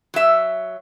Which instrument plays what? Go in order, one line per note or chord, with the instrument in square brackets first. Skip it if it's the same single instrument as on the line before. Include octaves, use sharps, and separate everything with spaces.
[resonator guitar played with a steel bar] F#3 E5